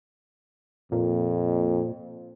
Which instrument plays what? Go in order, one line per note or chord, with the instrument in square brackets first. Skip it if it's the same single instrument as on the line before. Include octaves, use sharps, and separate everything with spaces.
[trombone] F2 [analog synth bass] A#2